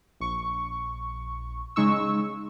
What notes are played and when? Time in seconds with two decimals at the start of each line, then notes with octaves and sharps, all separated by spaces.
0.20 A#1 C#6
1.76 C#3 G#3 D#4 C#6 E6